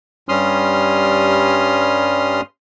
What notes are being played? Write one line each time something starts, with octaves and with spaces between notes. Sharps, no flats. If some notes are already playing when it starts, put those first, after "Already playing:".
G2 G3 C#4 C6 D#6 F6